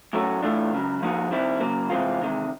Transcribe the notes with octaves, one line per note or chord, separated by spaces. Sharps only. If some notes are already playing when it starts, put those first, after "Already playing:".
A2 F#3 A3 C#4 F#4
A2 E3 A3 D4 F4
C#2 C#3 F#3
G#2 F3 A#3 D#4 F#4
D#2 D#3 G3 C4 E4
C#3 F#3 A#3
C3 E3 G#3 C4 F4
E2 C3 D#3 G#3